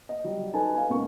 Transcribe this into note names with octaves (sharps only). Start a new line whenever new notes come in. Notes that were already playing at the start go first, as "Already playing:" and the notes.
D#5
F#3 G3
D#4 A4 B4 G#5 A5
F5 G#5
C#2 A#3 B3 A#4 C#6